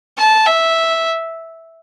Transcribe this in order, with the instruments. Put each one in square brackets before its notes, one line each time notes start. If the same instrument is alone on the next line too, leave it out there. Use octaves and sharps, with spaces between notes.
[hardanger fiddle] A5
E5